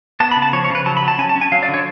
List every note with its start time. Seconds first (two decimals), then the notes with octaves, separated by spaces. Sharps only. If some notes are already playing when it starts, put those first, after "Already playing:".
0.20 B3 A5
0.31 B5
0.36 C#3
0.42 A5
0.53 F3 C#5
0.64 C#5
0.70 C#3
0.75 B4
0.86 F#3 A5
0.97 B5
1.02 F#3
1.08 A5
1.18 C#4 G#5
1.29 A5
1.36 C#4
1.41 G#5
1.52 F#3 F5
1.63 D5
1.68 D3
1.74 C#5